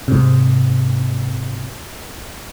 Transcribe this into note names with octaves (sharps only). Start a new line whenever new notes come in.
G#2 C3